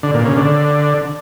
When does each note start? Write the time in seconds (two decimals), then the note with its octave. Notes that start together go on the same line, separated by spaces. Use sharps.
0.03 D3
0.14 A#2
0.25 C#3
0.37 D3